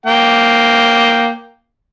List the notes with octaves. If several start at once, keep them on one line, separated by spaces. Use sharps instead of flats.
A#3 G5